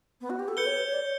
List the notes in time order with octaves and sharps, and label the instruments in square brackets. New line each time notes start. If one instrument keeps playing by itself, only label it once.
[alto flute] B3
F#4
G4
A4
[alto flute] B4 [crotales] G6 C#7 G7
[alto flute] C#5
B4
C#5
D5
C#5